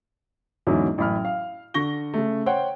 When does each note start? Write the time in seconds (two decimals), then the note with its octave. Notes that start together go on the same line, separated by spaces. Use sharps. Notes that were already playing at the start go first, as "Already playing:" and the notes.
0.67 E2 G#2 D3 F#3 C#4 E4
0.98 A1 F#2 B5 F6
1.25 F5
1.74 D3 C#6 A#6 G7
2.14 C#3 A3
2.46 C5 C#5 F#5 G5